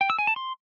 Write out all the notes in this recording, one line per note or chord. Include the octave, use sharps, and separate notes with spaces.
G5
E6
G#5
A5
C6